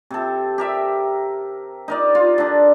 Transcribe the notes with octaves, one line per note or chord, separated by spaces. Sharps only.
C3 A4
G4 A#4 E5
D#4 A#4 D5
F4
D3 D4